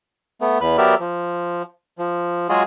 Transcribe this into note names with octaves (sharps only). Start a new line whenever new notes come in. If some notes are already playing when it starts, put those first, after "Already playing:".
A3 B3
E2 B4 F#6
F#3 B3 G4 A#4 D5 E5
F3
F3
F#3 G#3 F4 F#4 G#4